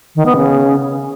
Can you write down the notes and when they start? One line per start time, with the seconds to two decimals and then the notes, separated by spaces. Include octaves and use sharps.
0.15 D#3
0.26 B3
0.36 C#3